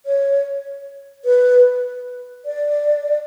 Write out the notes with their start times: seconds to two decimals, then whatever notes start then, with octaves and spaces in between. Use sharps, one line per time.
0.06 C#5
1.25 B4
2.45 D5